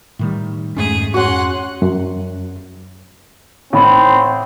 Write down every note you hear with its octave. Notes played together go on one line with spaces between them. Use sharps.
A2 D#3 G3
F2 G#2 A3 C#4 G#4
F2 C#4 F#4 F#5 C6 F#6
F#2
A1 C4 D#4 B5